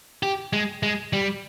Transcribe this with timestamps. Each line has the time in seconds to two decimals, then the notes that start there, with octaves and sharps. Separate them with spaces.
0.23 G4
0.53 G#3
0.83 G#3
1.13 G3